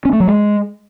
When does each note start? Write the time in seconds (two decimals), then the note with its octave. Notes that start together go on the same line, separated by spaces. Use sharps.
0.05 C#4
0.13 A3
0.20 F#3
0.28 G#3